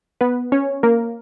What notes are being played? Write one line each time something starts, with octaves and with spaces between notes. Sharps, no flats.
B3 B4
C#4 C#5
A#3 A#4